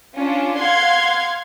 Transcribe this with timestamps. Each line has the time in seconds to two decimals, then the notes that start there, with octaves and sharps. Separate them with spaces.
0.16 C#4 D4 F4
0.59 F5 F#5 C6 G#6